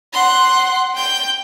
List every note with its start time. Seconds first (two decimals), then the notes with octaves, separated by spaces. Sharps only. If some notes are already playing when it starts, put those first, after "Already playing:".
0.13 F#5 C6
0.96 G5 G6